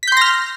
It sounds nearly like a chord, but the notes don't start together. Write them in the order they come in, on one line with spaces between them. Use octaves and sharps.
B6 G6 C6 A#6 F6